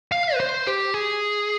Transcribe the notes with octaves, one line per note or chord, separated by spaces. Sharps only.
F5
B4
C5
G4
G#4